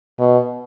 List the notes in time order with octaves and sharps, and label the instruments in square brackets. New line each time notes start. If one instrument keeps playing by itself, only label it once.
[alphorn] B2